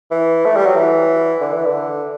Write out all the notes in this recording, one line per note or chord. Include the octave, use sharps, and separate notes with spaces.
E3
A3
G3
F#3
E3
D3
E3
D3